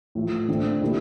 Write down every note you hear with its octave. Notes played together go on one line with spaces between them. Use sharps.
A2 F3 A3
D3 A3 C4
A#2 G3 A#3 E4